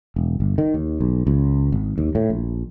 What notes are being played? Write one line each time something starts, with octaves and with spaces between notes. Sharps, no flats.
E1
G1
D#3
D#2
B1
C#2
G#1
D#2
A2
A#1